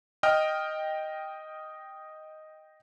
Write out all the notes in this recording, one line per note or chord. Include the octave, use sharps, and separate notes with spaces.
D#5 G5 F6